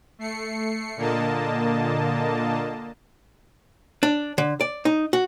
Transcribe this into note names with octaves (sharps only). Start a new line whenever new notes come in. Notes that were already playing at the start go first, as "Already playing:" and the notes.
A3 C7 C#7
A#2 D3 A#3 D#5 A5
D4
D3
D5
D#4
F#4